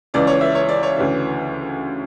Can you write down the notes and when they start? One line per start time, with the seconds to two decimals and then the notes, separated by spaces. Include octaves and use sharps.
0.14 C#2 C#3 E3 D5
0.27 C#5
0.41 E5
0.55 C#5
0.69 D5
0.83 C#5
0.96 D2 C#3 E3